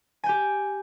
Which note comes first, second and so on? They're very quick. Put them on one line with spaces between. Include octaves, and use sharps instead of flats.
G#5 G5 G4